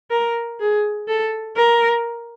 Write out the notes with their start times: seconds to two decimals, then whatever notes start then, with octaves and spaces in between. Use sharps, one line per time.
0.10 A#4
0.60 G#4
1.08 A4
1.56 A#4